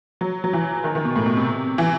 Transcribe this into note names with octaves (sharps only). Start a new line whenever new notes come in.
F#3
F#3
E3
D#3
D#3
B2
A2
B2
C3
E3